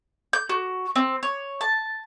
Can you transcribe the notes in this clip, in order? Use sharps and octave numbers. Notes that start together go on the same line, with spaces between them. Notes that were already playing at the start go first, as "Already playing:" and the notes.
G6
F#4
C4
C#5
A5